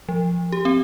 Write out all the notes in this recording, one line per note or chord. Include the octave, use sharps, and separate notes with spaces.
F3
G4
C4